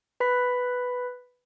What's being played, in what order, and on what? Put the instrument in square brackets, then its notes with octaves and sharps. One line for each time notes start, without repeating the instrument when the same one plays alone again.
[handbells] B4 B5 B6